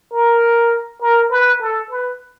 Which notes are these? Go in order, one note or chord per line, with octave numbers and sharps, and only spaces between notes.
A#4
A#4
B4
A4
B4